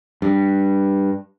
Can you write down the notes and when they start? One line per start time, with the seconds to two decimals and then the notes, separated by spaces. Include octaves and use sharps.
0.22 G2